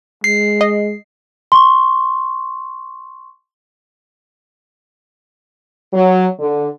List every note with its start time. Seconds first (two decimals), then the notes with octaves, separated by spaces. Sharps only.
0.24 G#3 C7
0.61 D#5
1.52 C6 C#6
5.93 F#3
6.40 D3